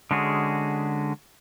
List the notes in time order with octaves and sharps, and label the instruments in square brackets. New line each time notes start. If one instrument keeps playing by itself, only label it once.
[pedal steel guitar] D3 G#3 C#4 F#4 G#4